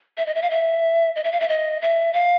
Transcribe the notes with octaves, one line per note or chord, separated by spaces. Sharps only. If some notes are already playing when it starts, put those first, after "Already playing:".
E5
D#5
E5
F5
E5
D#5
E5
F5
E5
D#5
E5
F5